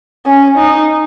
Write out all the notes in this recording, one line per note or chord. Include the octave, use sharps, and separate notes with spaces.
C#4
D#4